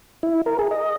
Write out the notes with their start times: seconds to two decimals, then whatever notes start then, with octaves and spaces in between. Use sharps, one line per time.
0.23 E4
0.46 A#4
0.59 G#4
0.71 D#5